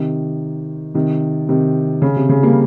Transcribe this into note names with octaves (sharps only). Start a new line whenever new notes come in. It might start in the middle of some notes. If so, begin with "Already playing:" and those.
Already playing: C3 D#3
C3 D#3
C3 D#3
C#3
C3
C#3
G3 A#3